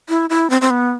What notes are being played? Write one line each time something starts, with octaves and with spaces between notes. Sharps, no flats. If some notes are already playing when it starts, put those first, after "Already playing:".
E4
E4
C4
C4
B3